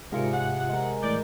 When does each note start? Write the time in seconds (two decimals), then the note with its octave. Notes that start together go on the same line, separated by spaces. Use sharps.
0.12 G#2 C3 F4 G#4 A#4 D5 C#7
0.33 F#5
0.69 G#3 A#4
1.03 A2 E3 D5 G6